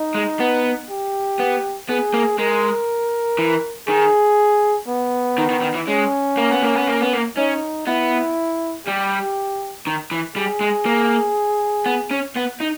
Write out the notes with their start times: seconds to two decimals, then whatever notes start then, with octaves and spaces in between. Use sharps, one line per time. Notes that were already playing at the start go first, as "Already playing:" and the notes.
Already playing: D#4
0.15 G#3
0.40 B3
0.90 G4
1.39 B3
1.89 B3 G#4
2.14 A#3
2.38 G#3 A#4
3.39 E3
3.88 D#3 G#4
4.88 B3
5.38 D#3
5.51 D#3
5.62 D#3
5.75 E3
5.88 G#3 C#4
6.38 A#3
6.50 B3
6.63 A#3
6.75 B3
6.87 A#3
7.01 B3
7.13 A#3
7.37 C#4 D#4
7.87 B3 E4
8.87 G3 G4
9.87 D#3
10.11 E3
10.36 G3 G#4
10.61 G#3
10.85 A#3
11.86 B3
12.11 C#4
12.36 B3
12.60 D#4